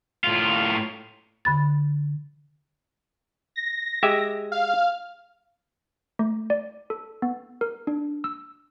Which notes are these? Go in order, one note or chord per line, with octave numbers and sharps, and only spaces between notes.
A2 F4
D3 B5 A6
A#6
G#3 G4 E5
F5
A3
D5
A4
B3
A#4
D4
E6